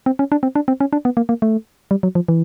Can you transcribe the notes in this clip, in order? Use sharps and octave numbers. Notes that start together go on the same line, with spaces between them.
C4
C#4
D4
C4
D4
C4
C#4
D4
B3
A#3
A#3
A3
G3
F#3
F3
E3